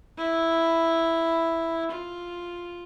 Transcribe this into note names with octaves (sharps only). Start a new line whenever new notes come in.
E4
F4